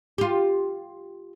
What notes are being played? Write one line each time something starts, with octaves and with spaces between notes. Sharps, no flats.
F4 G4